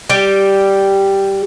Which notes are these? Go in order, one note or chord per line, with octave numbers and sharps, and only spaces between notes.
G3 G4